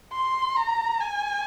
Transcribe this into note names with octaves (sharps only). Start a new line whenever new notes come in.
C6
A#5
G#5